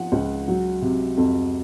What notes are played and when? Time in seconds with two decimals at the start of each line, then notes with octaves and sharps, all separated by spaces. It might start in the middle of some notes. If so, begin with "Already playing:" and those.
Already playing: F3 F#5
0.12 C#2
0.48 F#3
0.82 C3
1.17 F2